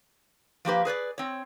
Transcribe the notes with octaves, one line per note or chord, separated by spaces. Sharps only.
F3 A#3 G4 B4
G#4 B4 C#5 D5
C4 C#5